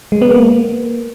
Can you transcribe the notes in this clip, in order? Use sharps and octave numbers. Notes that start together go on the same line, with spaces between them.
G#3
B3
A#3